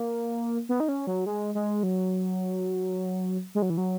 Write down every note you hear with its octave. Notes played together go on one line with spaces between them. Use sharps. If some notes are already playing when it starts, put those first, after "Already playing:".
Already playing: A#3
B3
D#4
C#4
F#3
G#3
G#3
F#3
G#3
F#3
E3
F#3